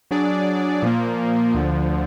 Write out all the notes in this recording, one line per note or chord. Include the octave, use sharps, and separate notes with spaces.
F#3 D4 G#4 D5
A#2 F3 A#3
D2 D3 F3